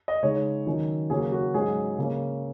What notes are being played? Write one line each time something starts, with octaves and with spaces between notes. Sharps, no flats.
D#5
C#3 G#3 D#4 C#5
D#3 F#3 C#4
C#3 F#3 A#3 C#4 G#4
F#4
G#2 F#3 C#4 G#4
C#3 A#3 C#4